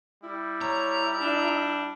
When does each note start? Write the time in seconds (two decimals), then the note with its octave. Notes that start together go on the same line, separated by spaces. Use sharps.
0.23 G3 E4
0.61 C#5 A#5
1.20 D4